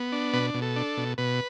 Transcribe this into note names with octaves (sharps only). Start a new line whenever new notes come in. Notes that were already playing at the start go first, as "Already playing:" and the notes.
Already playing: B3
D4
B2 B4
B2
A4
D4
B2
B2 B4